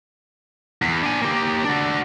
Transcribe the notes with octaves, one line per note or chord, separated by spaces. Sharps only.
E2
D4 G#5
A#3 G4
D4 F#4